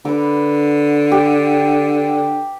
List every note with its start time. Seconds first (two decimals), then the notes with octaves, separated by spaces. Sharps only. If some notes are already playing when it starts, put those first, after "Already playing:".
0.05 D3 B4 D6
1.12 G4